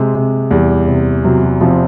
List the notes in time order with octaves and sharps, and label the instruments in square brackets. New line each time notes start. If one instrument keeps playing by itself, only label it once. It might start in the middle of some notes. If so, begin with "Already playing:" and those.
Already playing: [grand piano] C3 [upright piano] G#3
[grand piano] C3
[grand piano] E2 [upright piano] G3
[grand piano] C3
[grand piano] C3 [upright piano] F#3
[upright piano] F#3
[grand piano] C3 [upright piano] F3